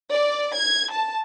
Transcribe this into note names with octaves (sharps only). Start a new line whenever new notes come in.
D5
G#6
A5